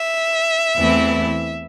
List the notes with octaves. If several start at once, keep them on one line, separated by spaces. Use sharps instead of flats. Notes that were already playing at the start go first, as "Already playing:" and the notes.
Already playing: E5
E2 E3 A3 C4 E4